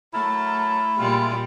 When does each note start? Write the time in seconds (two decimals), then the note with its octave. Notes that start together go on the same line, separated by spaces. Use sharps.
0.14 F#3 A3 E4 A#4 A5
0.98 A#2 G3 G#3 F4